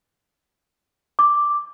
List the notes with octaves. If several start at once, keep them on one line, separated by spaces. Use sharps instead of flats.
D6